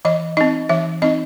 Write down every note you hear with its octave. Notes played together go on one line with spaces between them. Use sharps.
E3 D#5
C4 D#4 D#5
E3 E5
C4 D#4 D#5